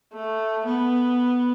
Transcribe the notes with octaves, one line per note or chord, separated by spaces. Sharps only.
A3
B3